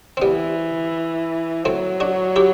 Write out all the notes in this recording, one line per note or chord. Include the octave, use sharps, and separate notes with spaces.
C4
E3 G3 B3
F#3 A3 C4
D4 F#4
E4 G4